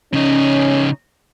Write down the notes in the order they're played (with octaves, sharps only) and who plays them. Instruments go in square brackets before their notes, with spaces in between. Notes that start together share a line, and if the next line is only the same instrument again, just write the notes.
[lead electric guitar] C#3 D#4 [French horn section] C#4